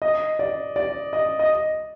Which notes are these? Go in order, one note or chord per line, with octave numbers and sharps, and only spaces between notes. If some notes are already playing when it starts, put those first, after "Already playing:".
D#5
D5
D5
D#5
D#5